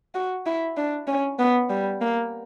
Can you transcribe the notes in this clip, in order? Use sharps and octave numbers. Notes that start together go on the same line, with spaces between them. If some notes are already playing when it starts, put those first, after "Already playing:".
F#4
E4
D4
C#4
B3
G3
A#3